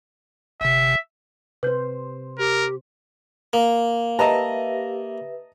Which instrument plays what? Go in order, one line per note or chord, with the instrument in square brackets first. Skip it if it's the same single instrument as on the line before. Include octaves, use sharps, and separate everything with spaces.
[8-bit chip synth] G1 C3 [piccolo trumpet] E5
[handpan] C3 C5 [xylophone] B4 G6
[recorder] G4 [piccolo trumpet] A#4
[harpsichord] A#3 [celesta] F5
[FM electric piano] G4 B4 E5 [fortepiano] D#5 A5 A#5